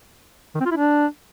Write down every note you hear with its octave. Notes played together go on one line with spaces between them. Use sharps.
D#3
C4
F4
E4
D4